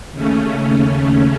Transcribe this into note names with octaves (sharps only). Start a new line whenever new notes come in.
D#2 C#3 A3 C#4